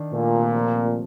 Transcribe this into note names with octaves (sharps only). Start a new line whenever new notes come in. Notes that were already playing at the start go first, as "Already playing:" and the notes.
Already playing: D#3 D4
A#2 A3
C3
F3
C4